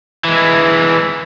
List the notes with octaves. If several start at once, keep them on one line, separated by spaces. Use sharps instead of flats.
E3 G#3